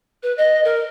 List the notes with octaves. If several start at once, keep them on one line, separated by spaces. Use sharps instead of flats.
B4
D#5
A#4